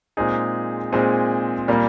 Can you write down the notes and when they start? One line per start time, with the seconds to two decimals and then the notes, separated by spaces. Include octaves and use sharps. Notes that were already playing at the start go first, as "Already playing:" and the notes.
0.17 A#2 G#3 C4 D#4 G#4
0.92 A#2 G#3 C4 D#4 G#4
1.68 A#2 G3 A#3